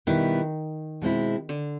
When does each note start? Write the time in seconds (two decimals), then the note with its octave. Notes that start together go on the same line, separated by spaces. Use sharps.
0.07 B2 D#3 G3 B3 E4
1.02 B2 G#3 C4 E4
1.49 D3